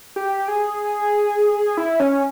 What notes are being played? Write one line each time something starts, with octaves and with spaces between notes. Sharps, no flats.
G4
G#4
E4
C#4